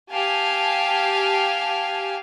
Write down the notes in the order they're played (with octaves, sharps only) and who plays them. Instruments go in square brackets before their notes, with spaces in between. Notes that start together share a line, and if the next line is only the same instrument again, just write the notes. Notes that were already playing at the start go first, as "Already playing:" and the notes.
[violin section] G4 F5 G#5 A5